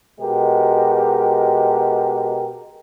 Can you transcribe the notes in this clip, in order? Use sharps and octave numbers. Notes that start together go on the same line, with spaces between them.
B2 G#3 G4 A#4